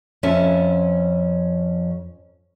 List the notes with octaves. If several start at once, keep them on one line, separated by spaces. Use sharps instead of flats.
F2 C#4 E5